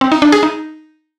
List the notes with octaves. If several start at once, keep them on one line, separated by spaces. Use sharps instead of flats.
C4
D#4
D4
G#4
D#4